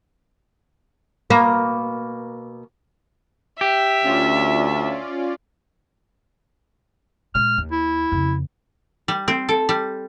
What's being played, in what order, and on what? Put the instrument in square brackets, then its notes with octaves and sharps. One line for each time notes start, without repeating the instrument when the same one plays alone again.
[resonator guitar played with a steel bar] B2 [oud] A#3
[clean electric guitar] G4 [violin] E5
[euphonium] D2 [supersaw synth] C#4 F4 D5
[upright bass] A#2 G#3 [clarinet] F6
[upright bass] D#2
[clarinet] E4
[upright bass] F2 C#3
[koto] G3
C4
A4
G3